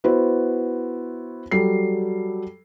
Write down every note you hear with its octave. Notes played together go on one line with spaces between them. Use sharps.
B3 E4 F#4 C5
F#3 G3 A4 C7